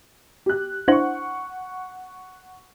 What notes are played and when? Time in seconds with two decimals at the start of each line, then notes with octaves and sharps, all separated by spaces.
0.46 G4 F#6
0.88 D4 E4 C5 F#5 C#6